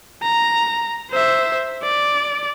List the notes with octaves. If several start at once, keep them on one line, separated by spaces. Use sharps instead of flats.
A#5
C5 E5
D5